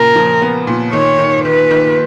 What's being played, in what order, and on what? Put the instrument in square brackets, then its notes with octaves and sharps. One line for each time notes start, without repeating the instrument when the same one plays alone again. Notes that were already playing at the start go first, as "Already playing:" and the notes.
Already playing: [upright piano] A#2 C#3 [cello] A#4
[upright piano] F3
B3
A#2
[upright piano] D#3 [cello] C#5
[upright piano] D#3
[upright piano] D#3 [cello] B4
[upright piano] D#3